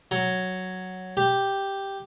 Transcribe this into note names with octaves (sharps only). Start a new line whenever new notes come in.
F#3
G4